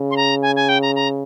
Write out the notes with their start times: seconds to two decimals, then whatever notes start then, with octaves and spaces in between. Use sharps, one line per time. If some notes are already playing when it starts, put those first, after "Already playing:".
Already playing: C#3
0.11 C6
0.17 A#5
0.42 G#5
0.56 G#5
0.69 G5
0.82 A#5
0.96 A#5